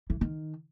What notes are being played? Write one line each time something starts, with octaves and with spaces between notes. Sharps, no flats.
E3
D#3